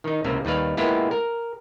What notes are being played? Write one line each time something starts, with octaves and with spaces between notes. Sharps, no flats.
D#3 D#4
C#2 C3 A#3
D#2 G3 B4 F5
G#3 A#3 B3 E4 F4 G4
A#4